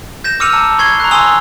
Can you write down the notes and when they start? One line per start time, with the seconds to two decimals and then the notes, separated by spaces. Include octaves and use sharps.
0.24 G6 A#6 E7
0.40 D6 E6 F6 C#7 D#7 F7
0.53 A5 A#5 D6 F7
0.78 B5 C#6 G#6 C7 G7
1.00 A#5 C#6 F#6
1.11 G#5 C6 D#6 E6 F7 G7